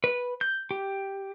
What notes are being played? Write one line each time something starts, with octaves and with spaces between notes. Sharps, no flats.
B4
G6
G4